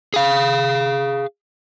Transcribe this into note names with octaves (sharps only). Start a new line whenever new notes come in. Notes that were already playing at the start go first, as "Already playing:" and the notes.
G#4 F5